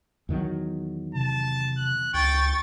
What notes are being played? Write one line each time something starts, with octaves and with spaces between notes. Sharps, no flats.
E2 D#3 F#3
C3 A5
F#6
C#2 G5 C#6 A6